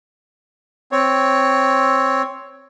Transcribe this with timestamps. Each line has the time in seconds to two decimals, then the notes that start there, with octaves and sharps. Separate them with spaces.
0.92 C4 C#5